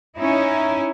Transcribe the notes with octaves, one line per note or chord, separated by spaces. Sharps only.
C#4 D#4 E4